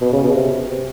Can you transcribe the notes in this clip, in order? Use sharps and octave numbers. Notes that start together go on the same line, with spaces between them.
B2
C#3
B2
C3